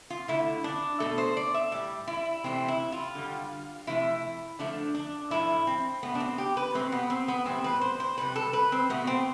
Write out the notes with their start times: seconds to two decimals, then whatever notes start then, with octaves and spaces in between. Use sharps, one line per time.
0.10 F4
0.28 D3 A3 E4
0.64 D4
1.00 B2 A3 A4
1.18 C5
1.37 D5
1.54 E5
1.72 A2 G3 D5
2.08 E4
2.44 C3 E3 A3 C4
2.68 E4
2.92 F4
3.15 D3 G3
3.87 C3 F3 A3 E4
4.59 D3 F3 A3 D4
4.94 D4
5.30 A2 F3 A3 E4
5.67 C4
6.03 B2 A3 B3
6.15 D4
6.20 C4
6.38 G4
6.57 B4
6.75 B2 A3 C4
6.92 B3
7.10 C4
7.28 B3
7.46 A2 E3 G3 C4
7.64 B4
7.81 C5
8.00 C5
8.18 C3 G3 B4
8.36 A4
8.53 B4
8.72 C4
8.90 B2 A3 B3
9.07 C4